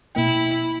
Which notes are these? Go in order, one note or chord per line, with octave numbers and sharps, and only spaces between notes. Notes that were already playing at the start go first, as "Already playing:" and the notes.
B2 A#3 E4 G5